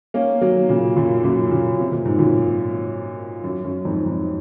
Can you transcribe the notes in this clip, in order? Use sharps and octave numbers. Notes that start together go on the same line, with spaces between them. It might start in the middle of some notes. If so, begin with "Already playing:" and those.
A#3 C#4
F#3 A#3
A#2 C#3
F#2 A#2
F#2 A#2
A#2 C#3
C3
A#2
G#2
F#2 A#2
F#2
F#2
F2 G#2
F2 G#2